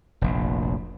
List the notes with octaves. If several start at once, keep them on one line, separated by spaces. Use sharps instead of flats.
F1 A#1